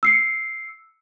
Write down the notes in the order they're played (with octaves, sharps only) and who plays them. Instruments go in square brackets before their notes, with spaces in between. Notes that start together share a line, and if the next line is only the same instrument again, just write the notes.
[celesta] E6 C7 C#7